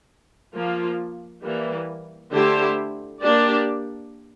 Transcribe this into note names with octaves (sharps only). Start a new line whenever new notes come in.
F3 A#3 F4
E3 G3 A#3
D3 A3 E4 G4 C5
A#3 D4 G4 D5